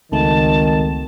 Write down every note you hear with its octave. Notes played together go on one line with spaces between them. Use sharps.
G#1 C#2 D#3 A3 A5